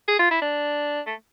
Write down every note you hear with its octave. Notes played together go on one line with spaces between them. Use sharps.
G#4
F4
E4
D4
A3